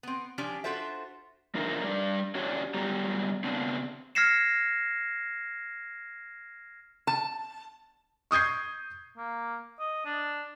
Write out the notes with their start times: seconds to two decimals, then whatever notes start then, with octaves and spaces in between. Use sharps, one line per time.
0.03 B3 C4
0.38 F3 C#4 D4 G4
0.64 D4 F4 F#4 A4 C5 E5
1.54 F3 D4 D#4 A#4 C5 E5
1.84 G3 D4 D5
2.35 C#4 D4 F#4 G4 C#5 D5
2.74 F#3 G3 B3 G4 D5 A#5
3.44 C#3 B3 C4 D4
4.15 F6 G#6 A#6 C7 C#7 E7
7.07 A5
8.31 C#6 D#6 G6 G#6 C7
9.18 A#3
9.79 D#5
10.05 D4